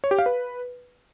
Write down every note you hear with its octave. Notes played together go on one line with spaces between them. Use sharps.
C#5
G4
F5
B4